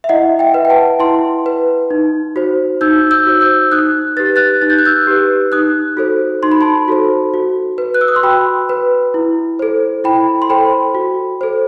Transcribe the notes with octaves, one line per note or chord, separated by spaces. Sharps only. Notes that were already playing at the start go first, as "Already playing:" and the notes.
E5
E4 D#5 F#5
E5 G5
B4
G5
F#5 A5
E4 A5 C6
B4
D#4
F#4 C5
D#4 E6 G6
E6 G6
F#4 C5
E6 G6
D#4 D#6 F#6
G4 B4 A6
F#6 A6
D#4 A6
G6
F#6
E6 G6
G4 B4
D#4 D#6 F#6
F#4 A4 C5
D#4 C6
B5
A5 C6
F#4 A4 C5
F#4
B4
F#6
E6
D#6
C6
F#4 G5 B5
B4
E4
A4 C5
E4 G5 B5
C6
A4 C5 G5 B5
F#4
A4 C5